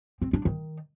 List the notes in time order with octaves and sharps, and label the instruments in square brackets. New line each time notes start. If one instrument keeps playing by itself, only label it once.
[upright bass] C4
D4
D#3